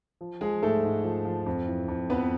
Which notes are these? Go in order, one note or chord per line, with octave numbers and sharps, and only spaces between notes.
F3
F3 G#3 G#4
G#2 A3 A4
G#2
F3
F3
F2
E3
F2
F2 B3 B4